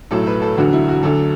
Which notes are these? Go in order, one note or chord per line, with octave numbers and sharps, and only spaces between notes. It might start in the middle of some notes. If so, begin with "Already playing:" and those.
B1 A2 F#3 A4
B4
A4
E1 D2 D3 F#3 F#4
E4
F#4
D2 D3 F#3 A4